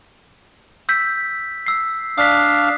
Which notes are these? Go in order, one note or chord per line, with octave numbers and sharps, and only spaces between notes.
E6 G6 B6
E6 C7
D4 F5 D#6 B6